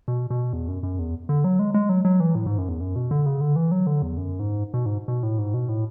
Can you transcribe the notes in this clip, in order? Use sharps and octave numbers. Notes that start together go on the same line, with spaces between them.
B2
B2
E2
F#2
F#2
E2
D3
F#3
G#3
G#3
F#3
F#3
E3
A2
G#2
F#2
E2
F#2
B2
D3
C#3
D3
E3
F#3
D3
E2
F#2
G#2
B2
G#2
B2
A2
G#2
B2
A2